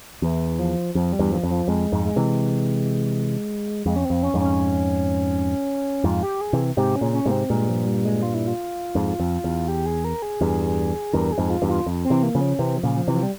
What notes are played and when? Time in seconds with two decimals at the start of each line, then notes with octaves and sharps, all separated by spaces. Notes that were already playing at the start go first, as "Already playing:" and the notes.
0.22 E2 E3
0.59 F3
0.95 F2 F3
1.13 G3
1.19 E2 G2
1.31 F3
1.44 F2
1.50 F3
1.68 F2 G#3
1.92 F2 G#2
2.05 G#3
2.16 C3 E3
3.86 F2 G#3
3.96 C#4
4.05 C4
4.10 F2
4.23 C#4
4.34 F2 G#2
4.40 C#4
6.04 F2 G#2 F4
6.23 G4
6.41 G#4
6.53 C3 E3
6.77 G#2 C3 G4
6.96 C#4
7.01 A#2 C#3
7.13 C#4
7.26 G#2 C3 A#3
7.31 C4
7.50 G2 A#2 G#3
7.68 F3
7.86 G3
8.04 G#3
8.23 F4
8.34 E4
8.47 F4
8.95 F2 G#2
9.20 F2
9.44 E2
9.68 G4
9.86 G#4
10.05 A#4
10.22 G#4
10.41 E2 G2
11.13 E2 G2 A#4
11.32 G#4
11.38 F2 G#2
11.50 F4
11.62 E2 G2
11.68 F4
11.87 F2
12.04 C4
12.10 C3 E3
12.23 A#3
12.35 C#3 F3
12.41 C#4
12.59 C3 E3 C4
12.77 F3
12.83 A#2 C#3
12.96 F3
13.08 C3 E3
13.14 F3
13.23 G3